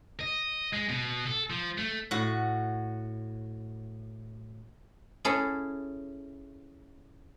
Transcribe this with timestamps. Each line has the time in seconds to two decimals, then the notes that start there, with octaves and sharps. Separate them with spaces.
0.20 D#5
0.73 G#3
0.89 B2
1.27 A4
1.50 F3
1.78 A3
2.11 A2 F#4
5.25 C#4 E4 G#4 A4